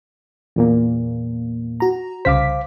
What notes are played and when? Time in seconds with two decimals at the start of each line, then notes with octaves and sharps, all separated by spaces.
0.56 E2 A#2 A#3
1.80 F#4 A#5
2.25 C2 C#3 C5 F5 D6 B6